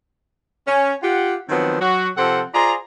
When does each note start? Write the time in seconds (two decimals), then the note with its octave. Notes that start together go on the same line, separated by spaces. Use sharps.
0.67 C#4
1.03 F4 G4 F#5
1.49 D#3 F3 F#3 B3 C4
1.81 F#3 F#4
2.17 C3 F3 C4 A4 C5 F#5
2.54 F4 G#4 C5 D5 A#5